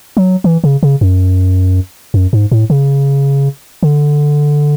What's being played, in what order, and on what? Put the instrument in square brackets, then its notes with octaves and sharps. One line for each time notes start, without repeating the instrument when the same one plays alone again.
[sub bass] F#3
E3
C#3
C#3
F#2
F#2
G#2
A2
C#3
D3